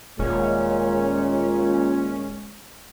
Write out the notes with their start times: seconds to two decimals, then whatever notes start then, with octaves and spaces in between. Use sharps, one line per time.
0.19 D#1 A#2 G#3 C#4